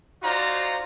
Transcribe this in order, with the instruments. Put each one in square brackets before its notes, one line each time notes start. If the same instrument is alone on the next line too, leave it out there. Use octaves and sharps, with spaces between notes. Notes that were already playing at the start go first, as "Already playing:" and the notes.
[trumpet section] D#4 F4 F#4 C5 D5 A#5